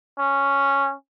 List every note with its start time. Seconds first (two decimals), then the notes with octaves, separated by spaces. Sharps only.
0.19 C#4